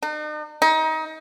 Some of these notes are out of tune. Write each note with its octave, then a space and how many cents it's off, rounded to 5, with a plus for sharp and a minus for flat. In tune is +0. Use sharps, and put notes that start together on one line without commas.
D#4 -45
D#4 +25